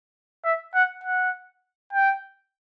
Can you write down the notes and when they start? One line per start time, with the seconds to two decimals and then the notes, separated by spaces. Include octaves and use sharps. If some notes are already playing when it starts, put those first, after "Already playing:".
0.45 E5
0.75 F#5
1.04 F#5
1.93 G5